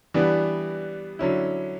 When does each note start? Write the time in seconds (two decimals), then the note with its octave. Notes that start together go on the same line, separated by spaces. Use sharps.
0.14 E3 G3 B3 D4
1.19 D3 F#3 C#4 E4